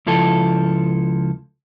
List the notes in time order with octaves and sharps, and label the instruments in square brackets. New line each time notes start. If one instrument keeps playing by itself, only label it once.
[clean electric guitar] C#2 F3 E4 A4